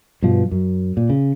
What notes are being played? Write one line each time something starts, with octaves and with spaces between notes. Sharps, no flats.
G2 B2 F3
F#2
A#2
C#3